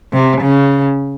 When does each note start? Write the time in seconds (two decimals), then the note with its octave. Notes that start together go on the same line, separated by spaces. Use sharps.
0.13 C3
0.42 C#3